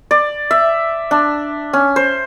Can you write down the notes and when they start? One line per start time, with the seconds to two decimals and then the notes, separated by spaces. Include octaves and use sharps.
0.11 D5
0.51 E5
1.11 D4
1.73 C#4
1.96 C5